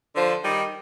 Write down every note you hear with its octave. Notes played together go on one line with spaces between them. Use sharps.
D3 F3
D#3 G3